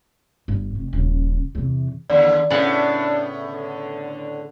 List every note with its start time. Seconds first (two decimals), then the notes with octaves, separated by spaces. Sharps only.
0.48 G1
0.75 F1
0.93 D#1 C#3
1.55 E2 C3
2.10 D#2 D3 D5
2.50 A2 C#3 B3 D4 F#5
3.44 D3